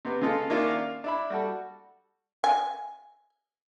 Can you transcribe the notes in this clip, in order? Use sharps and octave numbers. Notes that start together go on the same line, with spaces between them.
C3 B3
C#3 G#3 F4 A4
D#3 A#3 C#4 D4 E4 F4
F5
D4 E4 B5
G3 F#4 A4
G#5